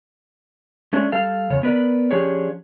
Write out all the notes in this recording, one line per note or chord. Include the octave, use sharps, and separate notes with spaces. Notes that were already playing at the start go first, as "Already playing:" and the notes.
G#3 A3 C#4 D4
G3 A4 F5
E2 C#3 C#5
B3 A#4 B4 D5
F3 C#4 D4 G4 G#4 C#5